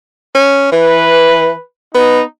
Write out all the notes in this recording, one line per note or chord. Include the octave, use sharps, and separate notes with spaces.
C#4
E3 B4
B3 D#4